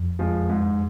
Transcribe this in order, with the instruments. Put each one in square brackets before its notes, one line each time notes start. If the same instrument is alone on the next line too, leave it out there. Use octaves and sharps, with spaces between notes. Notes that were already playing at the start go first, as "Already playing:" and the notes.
Already playing: [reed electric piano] F2
[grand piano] F3 G#3
G#2